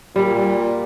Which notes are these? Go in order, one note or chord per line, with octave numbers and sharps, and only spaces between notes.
A#2 G3